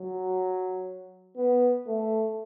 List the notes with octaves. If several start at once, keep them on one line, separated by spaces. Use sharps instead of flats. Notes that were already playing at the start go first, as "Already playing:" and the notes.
Already playing: F#3
B3
A3